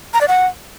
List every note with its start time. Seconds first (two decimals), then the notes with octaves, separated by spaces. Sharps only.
0.14 A#5
0.21 D5
0.28 F#5